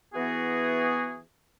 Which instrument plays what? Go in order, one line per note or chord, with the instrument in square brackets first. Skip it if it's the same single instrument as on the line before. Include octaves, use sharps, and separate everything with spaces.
[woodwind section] E3 B3 F#4 G#4